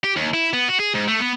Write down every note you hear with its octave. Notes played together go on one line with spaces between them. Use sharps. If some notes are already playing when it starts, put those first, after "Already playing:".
G4
D#2
E4
B3
F#4
G#4
G#2
A3
B3